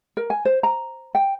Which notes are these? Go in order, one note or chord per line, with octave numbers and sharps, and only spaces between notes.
A#4
G#5
C5
A#5
G5